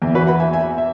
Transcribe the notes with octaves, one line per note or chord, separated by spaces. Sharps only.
E2 E3
F#4 B4
F#5 B5
E5 G#5
E5 G#5
E5